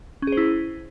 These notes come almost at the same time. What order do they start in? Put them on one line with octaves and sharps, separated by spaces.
C#4 G#4 C5 E4